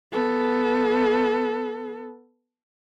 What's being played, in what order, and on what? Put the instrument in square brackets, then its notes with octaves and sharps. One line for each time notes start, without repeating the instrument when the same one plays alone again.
[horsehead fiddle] B3 A4